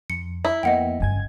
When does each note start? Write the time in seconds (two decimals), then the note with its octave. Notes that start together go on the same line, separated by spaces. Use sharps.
0.10 F2 C#7
0.45 E4
0.63 F2 A#3 B3 D#5 F#5 G5
1.00 G1 G2 C#3 G#5 G#6